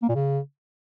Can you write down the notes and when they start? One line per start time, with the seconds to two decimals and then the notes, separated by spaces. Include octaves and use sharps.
0.02 A#3
0.09 A#2
0.15 C#3